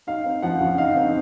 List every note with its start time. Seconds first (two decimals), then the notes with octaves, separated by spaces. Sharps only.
0.07 D#4 F5
0.25 C4
0.42 F3 F#5
0.60 C#3
0.78 D#4 F5
0.96 C4